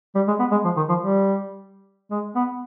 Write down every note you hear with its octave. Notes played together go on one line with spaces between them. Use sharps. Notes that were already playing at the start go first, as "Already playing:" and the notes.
G3
G#3
B3
G#3
F3
D#3
F3
G3
G#3
B3